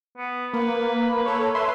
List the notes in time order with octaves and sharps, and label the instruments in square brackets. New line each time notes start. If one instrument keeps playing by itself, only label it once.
[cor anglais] B3
[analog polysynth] A#3 [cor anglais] B4
[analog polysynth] A4 C#5
B4 E5 C6